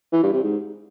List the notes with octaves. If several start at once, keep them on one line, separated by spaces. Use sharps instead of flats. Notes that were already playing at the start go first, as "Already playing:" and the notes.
E3
G2
C3
G#2